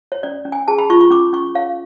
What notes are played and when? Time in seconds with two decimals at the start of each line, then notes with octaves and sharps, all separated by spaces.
0.12 C#5
0.23 C#4 D5
0.45 C#4
0.52 G#5
0.68 G#4 A5
0.78 B5
0.90 F4 C#6
1.01 C#6
1.11 C#4 D6
1.33 C#4 C#6
1.55 C#5 F5